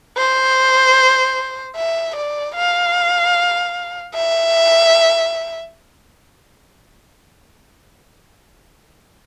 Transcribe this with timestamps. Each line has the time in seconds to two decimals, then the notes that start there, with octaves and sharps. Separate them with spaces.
0.18 C5
1.76 E5
2.16 D5
2.56 F5
4.15 E5